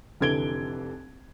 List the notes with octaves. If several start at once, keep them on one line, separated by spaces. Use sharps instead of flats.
F1 D3 E3 G#6 D7 G7